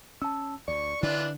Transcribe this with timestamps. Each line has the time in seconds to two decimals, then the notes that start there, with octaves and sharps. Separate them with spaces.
0.22 C#4 A5 E6
0.68 D2 D5 C#6
1.03 D3 E3 D4 F4